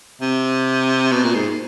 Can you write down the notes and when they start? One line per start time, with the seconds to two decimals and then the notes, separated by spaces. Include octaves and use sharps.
0.21 C3
1.12 B2
1.23 A#2
1.35 G#2